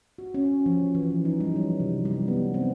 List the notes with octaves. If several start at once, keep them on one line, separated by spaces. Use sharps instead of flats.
F#4
C#4
F3
E3
D#4
G3
F#3
C3
G3
B3
C4